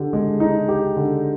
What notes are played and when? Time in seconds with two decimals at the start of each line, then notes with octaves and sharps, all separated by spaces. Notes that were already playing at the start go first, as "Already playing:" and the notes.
Already playing: D3 G4
0.13 G#3
0.40 D#4
0.68 G4
0.96 D3